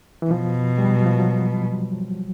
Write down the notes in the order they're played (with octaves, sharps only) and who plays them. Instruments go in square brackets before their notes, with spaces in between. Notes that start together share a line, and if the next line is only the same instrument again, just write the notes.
[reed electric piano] E3
[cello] B2 [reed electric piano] F3
[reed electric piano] G3
F#3
F3
F#3